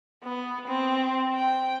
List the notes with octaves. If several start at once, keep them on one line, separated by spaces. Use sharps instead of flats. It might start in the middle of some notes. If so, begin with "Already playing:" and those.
B3
C4
G5